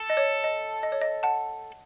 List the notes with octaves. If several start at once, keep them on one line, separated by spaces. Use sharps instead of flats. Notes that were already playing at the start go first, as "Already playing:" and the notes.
Already playing: A4
D#5
C#5
D#5
D#5
C#5
D#5
F#5 A5